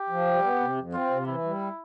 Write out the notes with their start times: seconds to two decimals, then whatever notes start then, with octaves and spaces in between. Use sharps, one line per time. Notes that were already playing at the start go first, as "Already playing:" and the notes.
Already playing: G4
0.09 F3
0.26 G3
0.43 B3
0.60 C3
0.76 F2
0.93 C4 F4
1.10 C3
1.27 E3 E4
1.44 G3